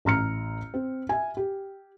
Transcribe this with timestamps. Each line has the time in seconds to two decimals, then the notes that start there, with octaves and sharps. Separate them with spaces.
0.05 A1 A#5 F6 C#7
0.74 C4
1.09 E5 G#5
1.37 G4